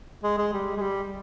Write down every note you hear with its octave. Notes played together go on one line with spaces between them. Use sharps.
G#3
G#3
G3
G#3
G3